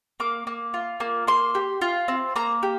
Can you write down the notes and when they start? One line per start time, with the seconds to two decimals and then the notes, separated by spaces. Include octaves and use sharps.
0.20 A#3 D6
0.47 A#3
0.74 F4
1.00 A#3
1.27 A#3 C6
1.55 G4
1.81 F4
2.08 C4
2.36 A#3 A#5
2.63 G4